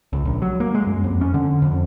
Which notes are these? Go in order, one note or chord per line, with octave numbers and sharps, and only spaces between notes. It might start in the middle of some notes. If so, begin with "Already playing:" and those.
C#2
A#1
F#3
A#3
G#3
F#2
F2
C#4
D3
F2